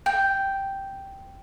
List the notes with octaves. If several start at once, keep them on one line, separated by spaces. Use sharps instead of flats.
G5